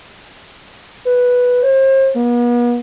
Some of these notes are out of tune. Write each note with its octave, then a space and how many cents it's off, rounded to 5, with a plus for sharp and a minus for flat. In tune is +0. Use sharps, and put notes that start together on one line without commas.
B4 -5
C5 +40
B3 -45